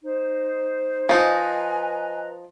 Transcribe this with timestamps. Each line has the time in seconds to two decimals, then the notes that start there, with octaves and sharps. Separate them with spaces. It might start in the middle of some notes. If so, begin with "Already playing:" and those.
0.02 D#4 C5
1.09 F3 D#4 B4 D#5 G#5 A#5